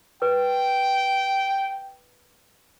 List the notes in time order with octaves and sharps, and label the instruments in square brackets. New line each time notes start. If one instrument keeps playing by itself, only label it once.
[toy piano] B4 [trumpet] G5